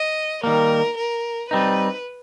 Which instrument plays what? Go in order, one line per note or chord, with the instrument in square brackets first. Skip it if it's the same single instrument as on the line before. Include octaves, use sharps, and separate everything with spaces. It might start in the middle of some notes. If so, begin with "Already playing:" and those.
Already playing: [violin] D#5
[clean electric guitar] D#3 G3 A#3 [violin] A#4
[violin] A#4
[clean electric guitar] G3 C4 D#4 [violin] B4